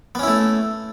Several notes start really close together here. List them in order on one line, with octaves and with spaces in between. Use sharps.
B3 C#4 E4 A3